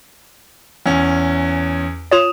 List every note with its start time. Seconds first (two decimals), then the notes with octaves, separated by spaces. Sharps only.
0.86 E2 C#4
2.12 F4 C#5 D#6 E7 F7